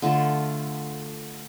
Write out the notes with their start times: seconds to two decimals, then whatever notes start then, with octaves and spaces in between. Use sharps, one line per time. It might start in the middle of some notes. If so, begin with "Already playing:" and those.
0.02 D3 A3 F4 A4